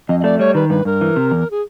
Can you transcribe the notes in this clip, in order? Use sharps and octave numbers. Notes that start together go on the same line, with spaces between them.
F2 D#5
D#5
A3 D5
G3 C#5
D#3 B4
G2 B4
G2 A#4
E3
C3
E2
G#4